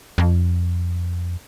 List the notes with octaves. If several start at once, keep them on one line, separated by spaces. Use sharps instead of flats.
F2